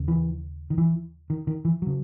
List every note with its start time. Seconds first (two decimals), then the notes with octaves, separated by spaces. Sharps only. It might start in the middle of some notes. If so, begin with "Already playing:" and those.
Already playing: D#2 C#3
0.08 E3
0.70 D#3
0.78 E3
1.30 D#3
1.47 D#3
1.65 E3
1.82 C#3 F#3